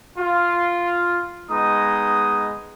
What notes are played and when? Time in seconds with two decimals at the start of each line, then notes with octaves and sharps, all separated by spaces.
0.18 F4
1.50 G#3 B3 D#4 D#5 D#6